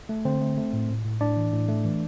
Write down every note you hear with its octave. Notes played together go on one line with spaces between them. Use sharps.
A3
D3 C4 C5
A3
A3
A2
A2
A2
A2 D4 D5
E3
A2
A3
E3